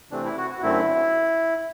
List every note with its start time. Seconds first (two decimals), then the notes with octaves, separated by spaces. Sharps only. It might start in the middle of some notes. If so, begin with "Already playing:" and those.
0.11 C3 E3 A3 C4 D4
0.24 E4
0.37 F#4
0.51 F#4
0.62 F#2 D3 A3 C4 E4